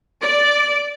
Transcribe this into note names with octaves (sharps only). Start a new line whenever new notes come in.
D5